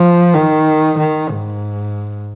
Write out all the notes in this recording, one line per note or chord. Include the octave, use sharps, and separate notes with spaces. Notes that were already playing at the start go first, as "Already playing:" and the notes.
Already playing: F3
D#3
D#3
G#2